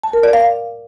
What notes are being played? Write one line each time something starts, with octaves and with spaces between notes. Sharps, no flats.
A5
A#4
D5
F5